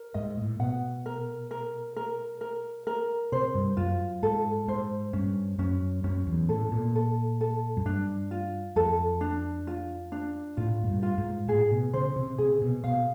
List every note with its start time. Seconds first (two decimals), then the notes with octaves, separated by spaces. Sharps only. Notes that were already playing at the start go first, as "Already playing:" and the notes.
Already playing: A#4
0.14 G#2 D#5
0.37 A2
0.60 B2 F#5
1.06 A#4
1.51 A#4
1.96 A#4
2.41 A#4
2.87 A#4
3.32 C3 C5
3.54 G2
3.77 F#2 F4
4.22 G#2 A4
4.68 G#2 C5
5.13 G2 C#4
5.58 F#2 C#4
6.04 F#2 C#4
6.27 E2
6.49 A2 A4
6.72 A#2
6.95 A4
7.41 A4
7.77 F#2
7.85 G2 D4
8.31 F4
8.76 F2 A4
9.21 D4
9.67 F4
10.12 D4
10.57 A2 F4
10.83 G#2
10.88 G2
11.02 F4
11.18 G#2
11.48 A2 G#4
11.71 B2
11.93 C#3 C5
12.16 C3
12.38 C3 G#4
12.62 B2
12.84 B2 F5